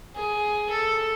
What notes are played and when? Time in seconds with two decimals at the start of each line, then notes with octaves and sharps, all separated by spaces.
0.15 G#4
0.70 A4